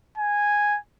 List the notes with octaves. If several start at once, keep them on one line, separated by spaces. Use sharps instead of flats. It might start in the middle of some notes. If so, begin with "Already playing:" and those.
G#5